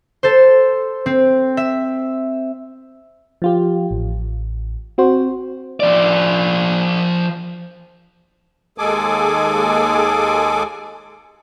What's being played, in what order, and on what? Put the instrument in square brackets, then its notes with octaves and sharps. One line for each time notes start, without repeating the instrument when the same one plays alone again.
[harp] A4 C5
C4
E5
[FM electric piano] F3 F4 G4
A1
C4 F#4 C5
[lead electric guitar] F3 D5
[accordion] D#2 G#3 G#4 A4 G#5 D6